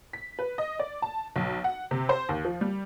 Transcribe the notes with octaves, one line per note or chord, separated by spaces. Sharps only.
B6
B4
D#5
D5
A5
B1
F#5
C3
C5
D#2
F3
G3